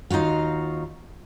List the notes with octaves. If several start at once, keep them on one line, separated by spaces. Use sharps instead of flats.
D#2 D#4 F4 F#4 F5